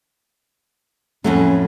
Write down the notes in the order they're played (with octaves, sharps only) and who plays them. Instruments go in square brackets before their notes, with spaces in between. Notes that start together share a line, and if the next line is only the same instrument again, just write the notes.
[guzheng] F2 A2 F#3 [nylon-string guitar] A3 [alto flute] C#4